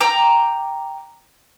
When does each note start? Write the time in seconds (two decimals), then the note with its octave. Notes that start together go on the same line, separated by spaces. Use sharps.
0.01 G5 A#5 D6